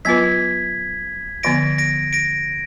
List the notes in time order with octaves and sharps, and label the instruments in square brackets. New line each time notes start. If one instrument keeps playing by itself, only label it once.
[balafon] F#3 B3 F4 B4 [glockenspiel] G#6 B6
[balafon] D3 F3 B3 [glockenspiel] A#6 D7
[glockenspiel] A#6 D7
A#6 D7